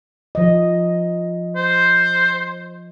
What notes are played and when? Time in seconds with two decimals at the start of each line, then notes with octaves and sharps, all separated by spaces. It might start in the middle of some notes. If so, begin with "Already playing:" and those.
0.35 F3 D#5
1.56 C5